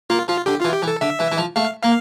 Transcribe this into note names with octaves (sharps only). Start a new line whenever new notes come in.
A#3 F4
F3 F4
D3 G4
E3 F4
G4
E3
A4
D3 E5
E3
E3
F3
A3 F5
A#3 F5